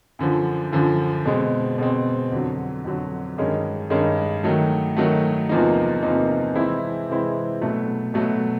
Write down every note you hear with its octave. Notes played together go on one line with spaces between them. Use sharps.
F#2 D3 F3
F#2 D3 F3
B2 G#3 C4
B2 G#3 C4
F2 D3 F#3
F2 D3 F#3
G2 D#3 G#3 C#4
G2 D#3 G#3 C#4
D#3 F#3 A3
D#3 F#3 A3
E2 C3 F3 A#3 D#4
E2 C3 F3 A#3 D#4
C3 E3 G#3 C4 E4
C3 E3 G#3 C4 E4
B2 F#3 A3
B2 F#3 A3